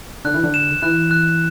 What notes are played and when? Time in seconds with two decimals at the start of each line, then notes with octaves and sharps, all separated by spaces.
0.25 D3 F#6
0.34 E3
0.43 D3
0.54 E7
0.82 E3 F#6
1.11 F#6